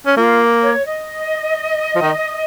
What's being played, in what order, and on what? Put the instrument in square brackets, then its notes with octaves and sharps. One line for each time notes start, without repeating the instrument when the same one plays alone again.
[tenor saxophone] C#4
[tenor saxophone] A#3 [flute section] F4
[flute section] C#5
D#5
[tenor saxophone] F3
D#3